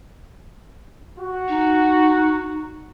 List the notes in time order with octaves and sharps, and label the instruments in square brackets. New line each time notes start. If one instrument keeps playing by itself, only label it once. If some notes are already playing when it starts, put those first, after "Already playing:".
[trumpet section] F#4
[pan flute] D#4